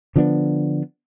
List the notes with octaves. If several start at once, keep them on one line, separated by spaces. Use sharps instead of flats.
D3 F3 B3 D4